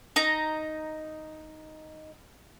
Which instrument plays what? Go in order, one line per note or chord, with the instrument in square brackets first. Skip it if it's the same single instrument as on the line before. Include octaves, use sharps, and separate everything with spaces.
[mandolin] D#4 A#5